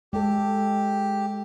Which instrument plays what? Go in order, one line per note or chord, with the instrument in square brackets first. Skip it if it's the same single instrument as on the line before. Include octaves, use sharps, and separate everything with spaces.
[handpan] G#3 A4 [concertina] G4